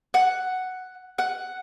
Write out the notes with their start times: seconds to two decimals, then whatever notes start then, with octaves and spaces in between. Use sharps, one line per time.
0.14 F#5
1.18 F#5